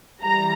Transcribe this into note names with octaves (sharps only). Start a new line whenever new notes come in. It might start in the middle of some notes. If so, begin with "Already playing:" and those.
E3 G3 A#5